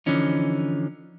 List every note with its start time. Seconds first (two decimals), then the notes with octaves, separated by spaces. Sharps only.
0.06 D3 E3 F3 C#4 D#4